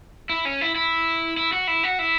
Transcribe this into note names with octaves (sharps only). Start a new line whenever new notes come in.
E4
C#4
E4
E4
E4
F#4
E4
F#4
E4